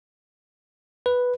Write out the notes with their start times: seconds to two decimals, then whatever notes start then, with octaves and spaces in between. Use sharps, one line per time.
1.06 B4